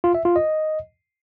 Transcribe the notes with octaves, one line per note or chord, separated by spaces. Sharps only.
F4
E5
F4
D#5